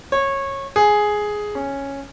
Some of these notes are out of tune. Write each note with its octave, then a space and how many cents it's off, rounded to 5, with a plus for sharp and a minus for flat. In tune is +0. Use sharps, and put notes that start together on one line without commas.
C#5 -20
G#4 +5
C#4 -5